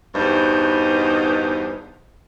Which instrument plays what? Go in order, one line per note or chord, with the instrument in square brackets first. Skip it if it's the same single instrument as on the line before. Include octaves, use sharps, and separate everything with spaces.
[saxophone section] E2 G2 B2 D#4 C5